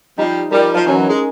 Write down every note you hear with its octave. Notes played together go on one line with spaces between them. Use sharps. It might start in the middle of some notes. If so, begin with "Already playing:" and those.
F3 G3 D#4
F3 G3 A#4
F3
E3 F#3 C#4
G#3